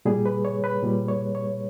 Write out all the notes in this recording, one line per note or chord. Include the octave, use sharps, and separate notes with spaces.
A#2 G3 G#4
B4
C#5
B4
A#2 G3
C#5
C#5